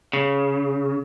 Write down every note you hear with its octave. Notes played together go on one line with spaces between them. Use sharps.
C#3